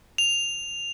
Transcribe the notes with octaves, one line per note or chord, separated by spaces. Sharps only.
F7